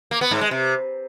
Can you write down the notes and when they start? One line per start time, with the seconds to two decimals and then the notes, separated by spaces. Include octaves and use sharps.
0.11 A#3
0.21 B3
0.31 G#2
0.41 G#3
0.51 C3